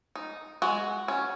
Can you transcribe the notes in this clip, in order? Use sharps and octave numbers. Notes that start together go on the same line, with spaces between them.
D#4
G#3 F#4
C#4